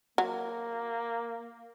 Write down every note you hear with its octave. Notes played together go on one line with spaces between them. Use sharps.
F#3 A#3